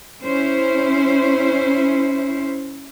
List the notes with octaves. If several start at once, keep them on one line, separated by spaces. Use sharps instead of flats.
C#4 E4 C5